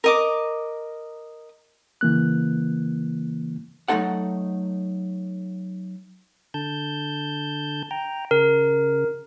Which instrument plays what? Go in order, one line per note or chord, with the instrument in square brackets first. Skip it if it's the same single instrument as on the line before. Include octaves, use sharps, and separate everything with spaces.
[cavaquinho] A#4 D#5 D6
[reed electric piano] C#3 E3 A#3 F#6
[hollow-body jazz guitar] F#3 A3 D4 D#4 A4 F#5
[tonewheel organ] D3 A5 G6
G5 A#5
[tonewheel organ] C#3 [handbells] A#4